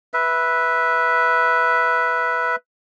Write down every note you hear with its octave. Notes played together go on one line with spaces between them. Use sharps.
B4 E5